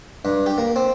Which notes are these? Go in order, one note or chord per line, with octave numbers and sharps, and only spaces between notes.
G2
G4
A#3
C4